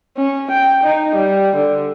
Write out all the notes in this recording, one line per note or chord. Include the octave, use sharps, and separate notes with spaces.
C#4
G5
D#4
G3
D3